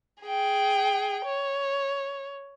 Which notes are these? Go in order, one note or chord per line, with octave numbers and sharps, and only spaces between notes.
G#4 G5
C#5